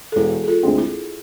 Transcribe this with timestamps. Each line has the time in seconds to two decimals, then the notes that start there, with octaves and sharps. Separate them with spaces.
0.12 A4
0.16 E1 E4 G#4
0.44 G#4
0.48 F4 A4
0.63 D2 D3 G#3 C4
0.78 E4 G#4